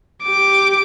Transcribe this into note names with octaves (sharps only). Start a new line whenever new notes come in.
G4 D6